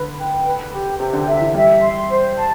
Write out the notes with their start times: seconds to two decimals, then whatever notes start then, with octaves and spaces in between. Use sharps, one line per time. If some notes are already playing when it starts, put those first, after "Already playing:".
Already playing: D3 B4
0.18 G5
0.46 B4
0.73 G4
0.99 C3 G4
1.13 D3
1.27 C3 E5
1.41 E3
1.55 G3 E5
1.81 C6
2.09 C5
2.36 A5